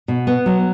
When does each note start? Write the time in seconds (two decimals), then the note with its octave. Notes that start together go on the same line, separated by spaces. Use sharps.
0.08 B2
0.27 B3
0.46 F#3